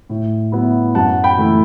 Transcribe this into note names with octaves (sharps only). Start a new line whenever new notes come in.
A2
F#3 B3 E4
F#2 F#5 A5
G5 B5
E3 A3 E4